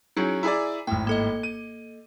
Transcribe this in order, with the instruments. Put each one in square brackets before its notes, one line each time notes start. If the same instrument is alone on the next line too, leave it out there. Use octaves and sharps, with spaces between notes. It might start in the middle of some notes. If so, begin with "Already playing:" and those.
[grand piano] F#3 C#4 [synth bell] D#4 E4 G#4
[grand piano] E4 G#4 D5 [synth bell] G#5 A#5
[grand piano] G#1 A2 [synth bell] G5
[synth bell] A#3 A4 D#5
[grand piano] D#7